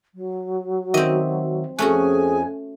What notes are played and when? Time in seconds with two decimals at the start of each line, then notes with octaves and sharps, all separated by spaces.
0.15 F#3
0.94 D#3 C4 F#4 D#5 E5
1.79 F2 A3 C#4 F#4 G#4 G#5 F#6